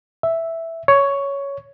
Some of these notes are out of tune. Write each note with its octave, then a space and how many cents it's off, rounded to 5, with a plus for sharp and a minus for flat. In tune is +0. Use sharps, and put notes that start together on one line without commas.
E5 +0
C#5 +10